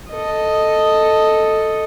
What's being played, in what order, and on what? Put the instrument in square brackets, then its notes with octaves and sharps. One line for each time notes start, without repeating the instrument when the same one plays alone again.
[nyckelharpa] A4 D#5